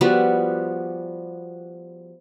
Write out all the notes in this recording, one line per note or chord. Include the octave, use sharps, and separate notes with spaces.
F3 G3 B3 F#4